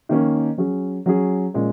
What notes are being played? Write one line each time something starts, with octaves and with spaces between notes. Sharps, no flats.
D#3 A#3 C#4
F#3 C#4 G#4
F#3 C#4 G#4
A#2 G#3 C#4